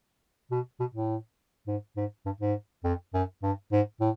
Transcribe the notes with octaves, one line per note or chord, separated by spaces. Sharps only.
B2
B2
A2
G#2
G#2
G2
G#2
F2
F#2
G2
G#2
A2